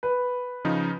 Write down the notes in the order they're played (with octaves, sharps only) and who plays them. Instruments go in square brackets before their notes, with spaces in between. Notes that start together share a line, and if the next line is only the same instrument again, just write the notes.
[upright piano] B4
[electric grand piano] C#3 F3 D#4